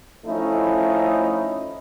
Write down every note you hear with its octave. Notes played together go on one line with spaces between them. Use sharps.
F3 A3 C#4 D#4 E4